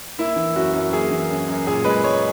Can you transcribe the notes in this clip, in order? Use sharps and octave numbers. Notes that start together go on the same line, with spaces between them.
A#3 E4
E3
F#2 F#4
F#2
A#3 G#4
E3
F#2
F#2
A#2 G#4
G#3 B4
G#3 C#5